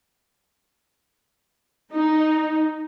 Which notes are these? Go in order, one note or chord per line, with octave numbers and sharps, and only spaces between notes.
D#4